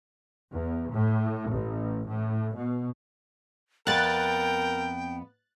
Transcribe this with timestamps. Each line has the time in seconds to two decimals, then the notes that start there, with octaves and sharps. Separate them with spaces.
0.50 E2
0.91 A2
1.50 A1
2.08 A2
2.55 B2
3.87 F2 B3 A#4 G5 F#6 A6